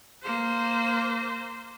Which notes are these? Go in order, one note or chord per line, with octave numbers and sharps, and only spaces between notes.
A#3 C5